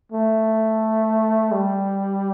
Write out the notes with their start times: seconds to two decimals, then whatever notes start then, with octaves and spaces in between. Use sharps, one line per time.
0.12 A3
1.52 G3